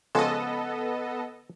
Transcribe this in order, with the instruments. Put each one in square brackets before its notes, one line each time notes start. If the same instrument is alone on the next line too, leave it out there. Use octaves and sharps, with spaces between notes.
[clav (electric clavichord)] C#3 F3 G#3 [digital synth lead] B3 [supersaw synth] A4 D#5